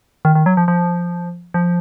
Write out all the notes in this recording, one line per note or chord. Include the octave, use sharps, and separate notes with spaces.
D#3
D#3
F#3
F3
F3
F3